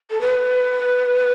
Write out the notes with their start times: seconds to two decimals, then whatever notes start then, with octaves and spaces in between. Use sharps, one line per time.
0.11 A4
0.21 B4